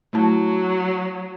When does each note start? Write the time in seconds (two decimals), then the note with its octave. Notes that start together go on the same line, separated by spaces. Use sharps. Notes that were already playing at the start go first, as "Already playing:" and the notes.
0.13 F#3 A3 E4 A5